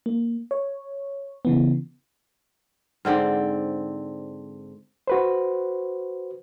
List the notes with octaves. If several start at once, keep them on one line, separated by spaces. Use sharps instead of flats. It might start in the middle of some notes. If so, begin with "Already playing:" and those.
A#3
C#5
C#3 E3 B3
G#2 D3 C4 D5
F#4 B4 C5